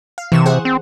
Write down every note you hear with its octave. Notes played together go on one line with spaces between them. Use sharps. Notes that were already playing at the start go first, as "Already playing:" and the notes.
F5
C3 E3 C#6 E7
G#4 C5 F#5
C4